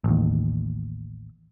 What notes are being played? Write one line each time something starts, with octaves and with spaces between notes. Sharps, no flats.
A1 D#2